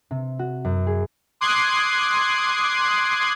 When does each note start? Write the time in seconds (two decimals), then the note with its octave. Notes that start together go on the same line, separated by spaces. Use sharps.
0.11 C3
0.39 F#4
0.65 F#2
0.87 G#4
1.41 C6 D6 D#6 F#6 G#6 C7